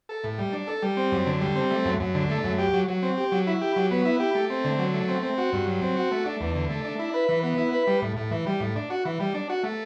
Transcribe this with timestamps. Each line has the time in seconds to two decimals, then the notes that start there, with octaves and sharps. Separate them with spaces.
0.09 A4
0.24 A2
0.38 G3
0.53 D4
0.67 A4
0.82 G3
0.97 C4
1.12 F#2
1.26 D3
1.41 G3
1.56 C4
1.71 A3
1.85 F#2
2.00 F#2
2.15 D3
2.30 A3
2.44 F#2
2.59 G4
2.74 F#3
2.88 F#3
3.03 C4
3.17 G4
3.32 F#3
3.47 E4
3.61 G4
3.76 F#3
3.91 B3
4.05 E4
4.20 G4
4.35 A3
4.50 C4
4.65 D3
4.79 F#3
4.94 A3
5.08 C4
5.23 C4
5.38 F#4
5.53 G2
5.67 F#3
5.82 C4
5.96 F#4
6.11 A3
6.26 D4
6.40 E2
6.55 D3
6.70 A3
6.85 D4
6.99 E4
7.14 B4
7.29 E3
7.43 B3
7.58 E4
7.73 B4
7.87 G3
8.02 A2
8.17 A2
8.31 E3
8.46 G3
8.61 A2
8.76 D4
8.90 F#4
9.05 E3
9.20 G3
9.34 D4
9.49 F#4
9.63 A3